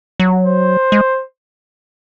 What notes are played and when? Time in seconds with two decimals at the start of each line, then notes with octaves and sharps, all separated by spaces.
0.20 F#3
0.46 C5
0.92 G#3